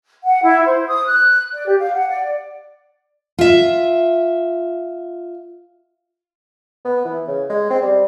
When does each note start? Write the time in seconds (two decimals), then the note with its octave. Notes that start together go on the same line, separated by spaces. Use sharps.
0.25 F#5
0.42 E4
0.65 C5
0.87 D#6
1.06 F#6
1.52 D5
1.67 G4
1.79 F5
1.94 F#5
2.09 D5
3.38 F4 E5
6.85 B3
7.05 E3
7.28 C#3
7.50 G#3
7.70 C4
7.82 G3